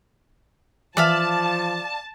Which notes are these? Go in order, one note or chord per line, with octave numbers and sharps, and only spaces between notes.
E3 F3 D5 E5 F5 A5